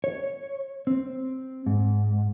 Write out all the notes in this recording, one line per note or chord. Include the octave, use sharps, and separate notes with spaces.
C#5
C4
G#2